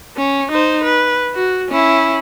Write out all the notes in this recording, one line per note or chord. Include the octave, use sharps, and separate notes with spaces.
C#4
D#4 C5
B4
F#4
C#4 E4